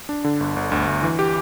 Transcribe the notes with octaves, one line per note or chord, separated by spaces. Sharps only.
D4
D3
G1
G1
D2
D2
E3
G4